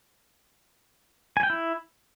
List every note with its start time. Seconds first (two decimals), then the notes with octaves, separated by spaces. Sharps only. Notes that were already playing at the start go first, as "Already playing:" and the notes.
1.37 G#5
1.43 G5
1.50 E4